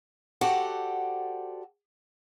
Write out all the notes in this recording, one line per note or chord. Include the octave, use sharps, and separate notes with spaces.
F#4 G4 A4 C5 D5 F#5